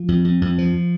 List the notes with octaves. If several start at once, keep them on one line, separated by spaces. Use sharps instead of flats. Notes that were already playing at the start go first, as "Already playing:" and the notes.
Already playing: F3
F2
F2
F2
F3